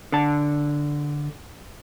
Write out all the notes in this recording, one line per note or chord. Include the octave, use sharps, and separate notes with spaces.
D3 A5